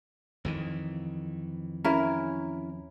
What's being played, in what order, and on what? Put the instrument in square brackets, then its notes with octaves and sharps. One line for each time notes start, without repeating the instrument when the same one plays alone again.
[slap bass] F2 D#3 E3
[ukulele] C#4 E4 A#4